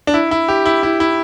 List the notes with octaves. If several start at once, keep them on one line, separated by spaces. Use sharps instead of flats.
D4
E4
E4
G4
E4
E4
E4